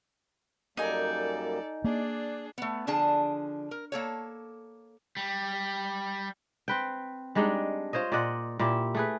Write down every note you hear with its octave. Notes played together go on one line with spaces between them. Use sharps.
F#2 G3 A#3 D#4 A4 D5 G#5
A#3 D4 G#4 D5
A3 B3
D3 F3 D4 G#4 A5
A#4
A#3 A4 C#5
G3
C4 B4 G5
G3 G#3 D4 D#4
F4 C5 C#5 D#5
A#2 D5 D#5 F#5
A#2 E4 G4
A3 G#4 B4